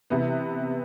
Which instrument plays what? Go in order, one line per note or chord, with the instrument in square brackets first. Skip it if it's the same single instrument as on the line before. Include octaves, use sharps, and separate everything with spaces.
[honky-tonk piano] C3 E3 B3